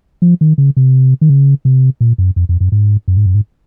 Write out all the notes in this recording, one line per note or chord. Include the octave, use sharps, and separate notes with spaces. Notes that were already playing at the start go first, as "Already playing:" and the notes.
F3
D#3
C#3
C3
D#3
C#3
C3
A#2
F#2
F2
F2
F#2
G#2
F#2
G#2
F#2
G#2